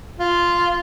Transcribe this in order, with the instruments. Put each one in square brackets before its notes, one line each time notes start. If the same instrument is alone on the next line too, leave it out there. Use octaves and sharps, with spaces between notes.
[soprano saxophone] F4